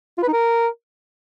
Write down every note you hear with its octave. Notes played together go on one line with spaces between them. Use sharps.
F4
B4
D#4
A#4